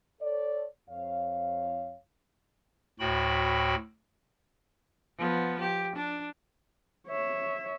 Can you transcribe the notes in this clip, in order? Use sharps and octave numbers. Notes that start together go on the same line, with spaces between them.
A4 C#5 D5
F2 C#5 F5
D2 A2 F#4 G5 B5
F3 B3
G4
D4
C#5 E5